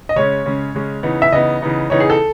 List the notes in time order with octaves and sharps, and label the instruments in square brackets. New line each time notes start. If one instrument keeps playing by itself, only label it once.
[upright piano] D#5
[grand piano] C#3 G#3 C#4 [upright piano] C#5
[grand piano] C#3 G#3 C#4
C#3 G#3 C#4
C#3 E3 B3 D#4
[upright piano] E5
[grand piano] C#3 E3 B3 D#4 [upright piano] D#5
[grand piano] C#3 E3 B3 D#4
[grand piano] C#3 E3 B3 D#4 [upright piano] C#5
[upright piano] G#4
A4